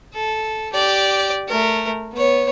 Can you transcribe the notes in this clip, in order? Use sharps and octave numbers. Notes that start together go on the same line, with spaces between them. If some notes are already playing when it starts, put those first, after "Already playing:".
A4
G4 D5
A3 A#4
B3 C#5